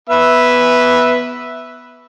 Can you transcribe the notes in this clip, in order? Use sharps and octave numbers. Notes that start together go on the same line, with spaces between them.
B3 E5